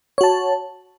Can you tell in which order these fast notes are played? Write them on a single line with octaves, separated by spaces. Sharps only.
C#5 F#4 A5